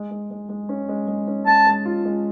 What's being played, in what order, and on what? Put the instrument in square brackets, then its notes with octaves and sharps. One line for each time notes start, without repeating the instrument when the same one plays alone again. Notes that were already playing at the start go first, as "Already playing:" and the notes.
Already playing: [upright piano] G#3
G#3
G#3
G#3
C#4
G#3
G#3
C#4
[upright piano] G#3 [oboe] A5
[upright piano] G#3
F4
G#3